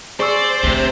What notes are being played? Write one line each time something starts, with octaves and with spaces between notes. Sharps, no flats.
G#4 C5 D5 C#6 E6
D2 C3